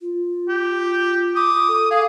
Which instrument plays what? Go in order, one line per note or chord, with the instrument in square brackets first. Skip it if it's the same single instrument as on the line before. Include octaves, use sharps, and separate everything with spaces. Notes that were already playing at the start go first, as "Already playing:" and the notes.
[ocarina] F4
[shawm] G4
[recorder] D6 [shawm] D#6
[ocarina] A4
[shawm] G#4 [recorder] F5